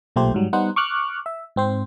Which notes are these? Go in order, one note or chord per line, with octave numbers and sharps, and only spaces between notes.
B1 A#2 A3 G4 C5
G#2 F#3 G3
G3 B3 D#4 C5 F#5
C#6 D6 F6 F#6
E5
G#2 C4 C5